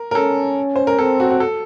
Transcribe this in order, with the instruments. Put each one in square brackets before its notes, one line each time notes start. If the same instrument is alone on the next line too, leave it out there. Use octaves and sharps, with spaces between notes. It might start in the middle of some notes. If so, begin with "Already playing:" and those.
Already playing: [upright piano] A#4
A#4
[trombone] C#4 [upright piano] A4
[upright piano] C5
A#4
[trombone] C4 [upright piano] A4
[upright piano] F#4
F#4
A4